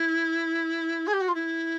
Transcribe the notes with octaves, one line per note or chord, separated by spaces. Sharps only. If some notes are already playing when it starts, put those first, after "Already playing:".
Already playing: E4
G#4
G4
F#4
F4
E4